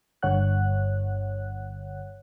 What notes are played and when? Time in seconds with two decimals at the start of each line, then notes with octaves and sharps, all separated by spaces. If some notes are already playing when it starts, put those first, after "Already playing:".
0.22 G1 G2 D3 C#5 F#5 F#6